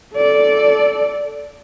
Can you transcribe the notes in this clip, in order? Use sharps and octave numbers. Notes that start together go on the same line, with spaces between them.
A4 D5